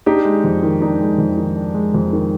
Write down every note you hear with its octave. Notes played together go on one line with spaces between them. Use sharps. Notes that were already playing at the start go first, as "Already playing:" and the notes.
D4 D#4 G4
G#3
F2
D#3
D4 D#4
G#3
F2
D#3
D4
G#3
F2
D#3